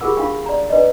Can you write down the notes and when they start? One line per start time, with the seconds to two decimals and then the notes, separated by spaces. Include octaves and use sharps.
0.01 F4 G4 G#4 A#4 F#5 E6
0.17 D4 F4 F5 G5 C#6
0.46 D5 A#5
0.70 D4 B4 D5 D#5